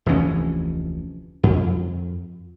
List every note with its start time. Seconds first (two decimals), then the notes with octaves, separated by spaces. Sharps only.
0.06 F1 D2 E3 C#4
1.43 F2